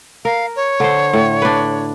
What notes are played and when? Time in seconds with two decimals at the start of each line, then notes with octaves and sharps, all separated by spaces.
0.25 A#4 F5
0.56 C#5
0.80 D3 C5
1.13 A2
1.42 D4 B4